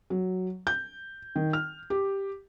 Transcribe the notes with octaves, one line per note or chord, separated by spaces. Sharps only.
F#3
G6
D#3
F6
G4